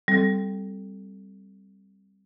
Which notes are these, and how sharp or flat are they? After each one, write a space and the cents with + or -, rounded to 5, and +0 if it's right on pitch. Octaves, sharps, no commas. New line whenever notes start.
G3 +0 C4 +0 A4 +0